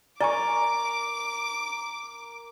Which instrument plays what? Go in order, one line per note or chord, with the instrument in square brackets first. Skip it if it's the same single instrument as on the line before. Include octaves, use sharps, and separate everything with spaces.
[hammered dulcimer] A#4 [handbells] D5 G#5 C#6 [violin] D6